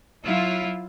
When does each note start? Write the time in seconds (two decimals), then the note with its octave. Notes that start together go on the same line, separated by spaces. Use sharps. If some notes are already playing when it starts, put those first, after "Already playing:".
0.25 F#3 E4 F4